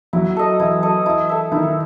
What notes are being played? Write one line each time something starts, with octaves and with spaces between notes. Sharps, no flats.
F#3 E4
A4 D#5
E3 E4
A4 D#5
E4
A4 E5
D#3 E4